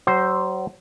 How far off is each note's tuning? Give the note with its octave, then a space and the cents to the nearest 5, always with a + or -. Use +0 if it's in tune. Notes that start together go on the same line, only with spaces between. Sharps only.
F#3 +30 C5 +0